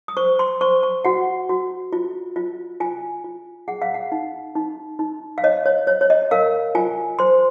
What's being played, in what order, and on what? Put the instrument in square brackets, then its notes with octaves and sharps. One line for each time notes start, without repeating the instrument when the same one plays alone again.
[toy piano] D#6
C5 C#6
C6
C5 C#6
C#6
F#4 F#5
F#4
F4
F4
F4 G#5
F4
G#4 F#5
F5
F#5
D#4
D#4
D#4
F5
C#5 D#5
C#5
C#5
C#5
D#5
A#4 F5
F4 G#5
C5 C6